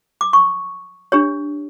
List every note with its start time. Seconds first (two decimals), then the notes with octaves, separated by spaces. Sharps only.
0.21 D6
0.33 C#6
1.12 D4 G4 C#5